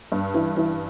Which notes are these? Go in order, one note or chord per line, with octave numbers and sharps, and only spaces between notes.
G2
E3
E3